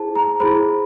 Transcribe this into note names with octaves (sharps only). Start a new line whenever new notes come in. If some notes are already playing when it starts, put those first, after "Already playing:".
Already playing: E4 G#4 C5 A5
A#5
E4 G#4 C5 B5